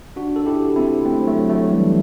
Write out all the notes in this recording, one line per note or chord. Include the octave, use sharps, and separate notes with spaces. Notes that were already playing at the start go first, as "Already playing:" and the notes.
D4 F#4
A4
E4 G4
C4 E4
A3 C4
F#3 A3
F#3 A3
E3 G3